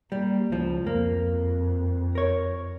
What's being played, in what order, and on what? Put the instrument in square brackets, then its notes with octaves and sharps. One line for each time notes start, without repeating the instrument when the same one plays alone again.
[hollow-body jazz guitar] G3 [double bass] A#3
[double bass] C#2 [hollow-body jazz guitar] F3
[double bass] F2 [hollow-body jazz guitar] A#3
[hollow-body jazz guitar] A#4 C#5